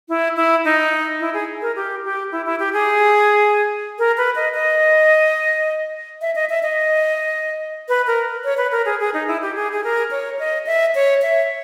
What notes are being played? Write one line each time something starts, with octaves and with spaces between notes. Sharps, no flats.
E4
E4
D#4
E4
G#4
A#4
G4
G4
E4
E4
G4
G#4
A#4
B4
D#5
D#5
E5
D#5
E5
D#5
B4
A#4
C#5
B4
A#4
G#4
G#4
D#4
E4
G4
G#4
G#4
A#4
C#5
D#5
E5
C#5
E5